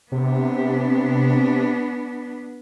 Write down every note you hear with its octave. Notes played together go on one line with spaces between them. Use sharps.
C3 B3 D4